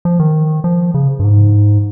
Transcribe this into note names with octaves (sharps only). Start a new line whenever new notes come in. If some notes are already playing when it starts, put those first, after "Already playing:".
F3
D#3
F3
C#3
G2
G#2